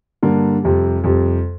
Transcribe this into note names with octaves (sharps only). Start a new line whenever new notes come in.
G2 D3 A#3
F2 C3 G3
F2 C3 G3